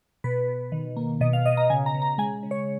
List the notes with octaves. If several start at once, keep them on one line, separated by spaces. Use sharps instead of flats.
B2 B4
B2
D#3
A#3
B2 D#5
F5
B2 D#5
A#5
C#3 G#5
A#5
C#3
A#5
G#3 G#5
C#3
C#5